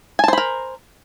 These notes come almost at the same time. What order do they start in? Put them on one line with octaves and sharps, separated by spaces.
G#5 A5 C5 B5 A#4